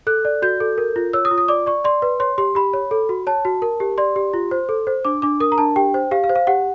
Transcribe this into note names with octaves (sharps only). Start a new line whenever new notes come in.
A4 F#6
D5
F#4 G6
A4
A#4
F4
C#5 E6
D#6
F4
D#6
D5 D6
D5 C#6
D5 C6
B4
C#5 C6
G4 C6
G4 B5
C#5
A4
F#4
C#5 A5
F#4
A#4
G4
D5 C6
G4
F4
C5
A4
C5
D4 D6
D4 D6
A#4 D#6
A#5
D4 A5
G4 G5
C5
G4 F5
F5
C5
F5
G4 F#5